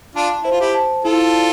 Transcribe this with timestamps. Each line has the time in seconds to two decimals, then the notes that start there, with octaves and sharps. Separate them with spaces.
0.15 D4 F4 A5
0.43 E4 C5
0.52 F4
0.60 E4 G4
0.75 A5
1.04 E4 F4 A4
1.34 D5